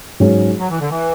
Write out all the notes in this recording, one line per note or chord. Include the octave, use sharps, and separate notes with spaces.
G#2 F#3 C#4 G#4
F#3
E3
D3
E3